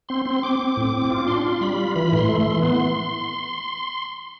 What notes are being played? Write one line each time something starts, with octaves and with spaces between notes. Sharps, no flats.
C4 C6
C4 C6
C4 D6
C4
A2
C4
F4
D4 C6
F4
G3 B5
F4
E3 B5
A2 C6
A3
C6
E3
B3 C6